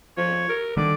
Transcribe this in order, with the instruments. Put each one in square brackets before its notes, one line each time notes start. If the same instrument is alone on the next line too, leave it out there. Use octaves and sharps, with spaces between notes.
[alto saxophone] F3 [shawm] C#5
[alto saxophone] A#4
[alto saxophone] D3 [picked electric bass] D#3 G3 [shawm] D5